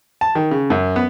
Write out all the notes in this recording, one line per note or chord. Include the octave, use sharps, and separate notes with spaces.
A5
D#3
C#3
F#2
B3